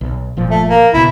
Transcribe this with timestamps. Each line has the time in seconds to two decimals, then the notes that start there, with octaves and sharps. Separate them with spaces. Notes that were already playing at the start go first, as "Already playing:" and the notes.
0.01 B1
0.37 G1 A#2 F3
0.50 A3
0.69 A#3
0.93 C#2 B2 E4